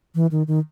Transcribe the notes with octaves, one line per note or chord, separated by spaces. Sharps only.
E3
D#3
D#3